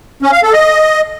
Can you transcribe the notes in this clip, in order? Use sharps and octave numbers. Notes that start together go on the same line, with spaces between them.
C#4
F5
A4
D#5